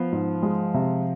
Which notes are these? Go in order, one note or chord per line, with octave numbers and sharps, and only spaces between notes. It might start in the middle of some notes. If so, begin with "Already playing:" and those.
Already playing: F3 B3
G#2
G#3
C3